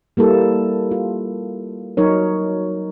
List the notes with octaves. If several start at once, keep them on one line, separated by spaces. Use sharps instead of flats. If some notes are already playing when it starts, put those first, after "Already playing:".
G3 A#3 E4 A4
F4
F#3 D#4 A#4 C#5